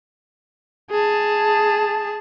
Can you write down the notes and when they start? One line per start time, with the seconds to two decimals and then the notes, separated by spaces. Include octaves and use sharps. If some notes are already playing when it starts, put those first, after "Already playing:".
0.91 G#4 A5